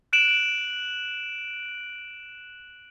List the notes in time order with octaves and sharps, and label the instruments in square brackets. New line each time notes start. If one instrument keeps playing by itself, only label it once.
[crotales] F#6 D7 E7 F#7